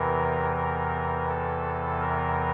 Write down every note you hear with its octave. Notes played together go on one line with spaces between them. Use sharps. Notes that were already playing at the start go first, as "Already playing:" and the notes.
Already playing: E2 C3 E3 A#4
A#4
A4
A#4